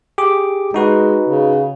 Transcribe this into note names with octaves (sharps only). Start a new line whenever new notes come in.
G4 G#4 D6
G#3 D#4 F#4 B4
C#3